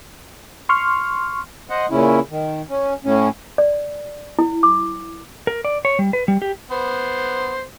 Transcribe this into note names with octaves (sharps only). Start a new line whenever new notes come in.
C6 C#6 F6
C5 D#5 F#5
A#2 C#3 C#4 E4
D#3
C#4
A2 C#4
D5
E4
D6
A#4
D5
C#5
G3
B4
G3
G4
B3 C5